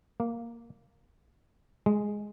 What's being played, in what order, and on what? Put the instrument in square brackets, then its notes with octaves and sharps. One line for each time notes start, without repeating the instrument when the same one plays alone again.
[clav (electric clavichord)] A#3
G#3